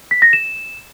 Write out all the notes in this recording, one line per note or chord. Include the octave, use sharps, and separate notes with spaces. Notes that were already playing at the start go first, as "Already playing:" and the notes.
B6
A#6
E7